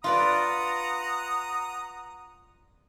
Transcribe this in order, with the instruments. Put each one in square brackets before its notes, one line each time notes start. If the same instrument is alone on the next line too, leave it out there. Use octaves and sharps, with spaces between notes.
[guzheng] F4 B4 D5 [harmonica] F#5 A#5 D#6